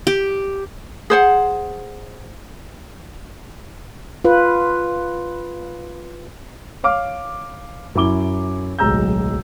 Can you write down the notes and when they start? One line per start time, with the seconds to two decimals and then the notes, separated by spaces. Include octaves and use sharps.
0.07 G4
1.10 G#4 C5 F#5
4.24 F4 B4
6.84 C#5 F5 D6 F6
7.95 F#2 E4 D6 G7
8.79 D1 B1 G#3 A#5 E6 G6